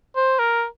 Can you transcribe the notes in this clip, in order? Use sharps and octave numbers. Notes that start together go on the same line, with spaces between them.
C5
A#4